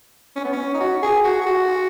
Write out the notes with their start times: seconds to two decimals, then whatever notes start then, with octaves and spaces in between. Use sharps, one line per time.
0.36 C#4
0.44 B3
0.53 C#4
0.75 D#4
0.80 F#4
1.02 G#4
1.24 F#4
1.41 G#4
1.46 F#4